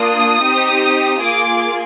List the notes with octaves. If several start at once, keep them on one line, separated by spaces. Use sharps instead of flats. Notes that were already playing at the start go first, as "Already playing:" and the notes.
Already playing: A#3 D4 F4 D#6
C4 D#4 G4
A#3 F4 G#4 D6